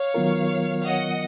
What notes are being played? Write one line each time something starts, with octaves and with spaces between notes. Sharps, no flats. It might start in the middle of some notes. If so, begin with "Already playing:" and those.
Already playing: C#5 F5
D#3 F#3 B3 F4 A#4
D#5 F#5